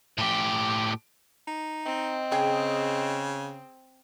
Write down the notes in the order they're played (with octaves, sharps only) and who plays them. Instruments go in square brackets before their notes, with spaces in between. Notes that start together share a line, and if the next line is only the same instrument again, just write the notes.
[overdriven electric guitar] A2 G4
[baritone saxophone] D#4
[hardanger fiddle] C4 [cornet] D#5
[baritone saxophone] C#3 [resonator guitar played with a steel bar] G#4 G5